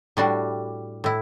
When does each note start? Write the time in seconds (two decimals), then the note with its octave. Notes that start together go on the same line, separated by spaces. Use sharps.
0.17 A2 G3 D4 F#4
1.04 A2 E4